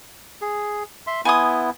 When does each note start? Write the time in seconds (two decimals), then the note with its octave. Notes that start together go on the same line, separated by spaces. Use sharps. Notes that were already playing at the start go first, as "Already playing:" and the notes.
0.41 G#4
1.07 E5 C6
1.25 B3 E4 G#5 C6 D#6